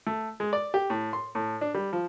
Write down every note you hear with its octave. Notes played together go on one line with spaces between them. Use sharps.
A3
G#3
D5
G4
A2
C6
A2
D4
G3
F3